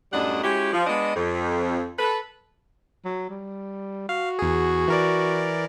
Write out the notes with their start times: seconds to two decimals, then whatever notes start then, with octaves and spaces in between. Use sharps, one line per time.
0.12 F#2 A2 G3 D4 D#5 F#5
0.43 G#3 C#4 E4 F#4 G4
0.73 F3
0.87 G#3 B3 D4 D#5
1.16 F2
1.98 A4 B4
3.05 F#3
3.29 G3
4.09 F#4 F5
4.39 E2 G#4
4.88 E3 A#4 D5